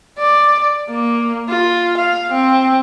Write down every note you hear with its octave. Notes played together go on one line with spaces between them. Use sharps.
D5
A#3
F4
F5
C4